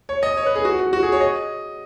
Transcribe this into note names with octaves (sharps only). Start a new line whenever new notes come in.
C#5
D#5
C#5
B4
G#4
F#4
F#4
F#4
G#4
C#5
D#5